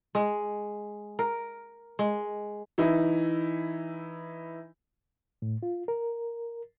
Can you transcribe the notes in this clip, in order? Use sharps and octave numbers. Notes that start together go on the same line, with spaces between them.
G#3
A#4
G#3
E3 D#4 E4
A2
F4
A#4